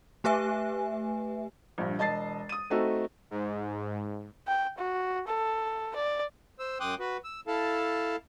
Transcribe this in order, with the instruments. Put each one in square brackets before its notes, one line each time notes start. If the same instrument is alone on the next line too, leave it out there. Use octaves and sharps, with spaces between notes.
[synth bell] A3 G4 B4 E5 G#5
[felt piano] A#1 G2
E1 D#5 A5 A6 C7
D#6 D#7
A3 C4 D#4 F#4 A4
[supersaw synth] G#2
[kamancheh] G5
F#4
A4
D5
[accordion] C5 E6
F#2 G5 C6 D6 D#6 F#6
F#4 B4
E6
E4 A4 F5 A5